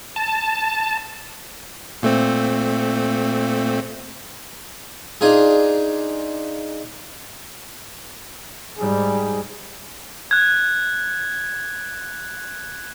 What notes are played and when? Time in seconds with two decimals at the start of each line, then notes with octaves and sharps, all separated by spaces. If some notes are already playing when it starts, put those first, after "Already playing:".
0.16 A5
2.03 A#2 A3 C4
5.21 D4 D#4 F4 G#4
8.79 G#2 G3 G#4
10.31 F#6 G#6